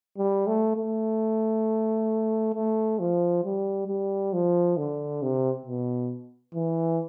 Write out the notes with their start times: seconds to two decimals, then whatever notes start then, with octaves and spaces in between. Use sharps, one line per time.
0.18 G3
0.47 A3
0.77 A3
2.54 A3
2.99 F3
3.44 G3
3.88 G3
4.33 F3
4.77 D3
5.22 C3
5.66 B2
6.55 E3